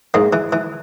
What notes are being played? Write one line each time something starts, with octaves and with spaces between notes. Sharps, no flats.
G#2 A#3
E3
E3